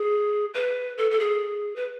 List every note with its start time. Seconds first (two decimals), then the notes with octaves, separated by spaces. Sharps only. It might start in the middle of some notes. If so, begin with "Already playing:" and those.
Already playing: G#4
0.54 B4
0.98 A4
1.11 A4
1.19 G#4
1.76 B4